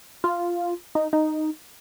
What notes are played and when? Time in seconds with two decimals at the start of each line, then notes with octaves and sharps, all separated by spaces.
0.24 F4
0.95 D#4
1.13 D#4